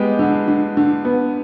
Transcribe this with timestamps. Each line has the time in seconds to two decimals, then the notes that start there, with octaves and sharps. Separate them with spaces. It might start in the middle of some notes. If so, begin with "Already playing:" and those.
Already playing: G#3 B3 G4
0.19 D3
0.48 D3
0.77 D3
1.05 B3